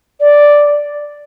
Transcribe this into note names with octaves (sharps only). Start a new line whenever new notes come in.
D5